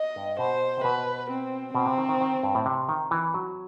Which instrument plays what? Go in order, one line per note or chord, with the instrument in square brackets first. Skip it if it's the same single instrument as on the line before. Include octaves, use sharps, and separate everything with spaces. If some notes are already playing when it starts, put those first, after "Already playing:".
Already playing: [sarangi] D#5
[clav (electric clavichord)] G2
[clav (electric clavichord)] B2 [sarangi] C5
[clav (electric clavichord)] C3
[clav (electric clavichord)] B2 [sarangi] B4
[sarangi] C4
[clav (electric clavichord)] B2 [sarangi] C4
[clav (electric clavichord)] C3
D#3
D#3
D#3
G2
A2
C3
D#3
E3
F#3